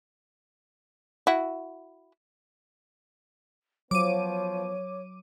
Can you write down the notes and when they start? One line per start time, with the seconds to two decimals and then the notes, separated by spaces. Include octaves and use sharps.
1.27 E4 F#4
3.91 F3 F#3 B3 C#5 D6 D#7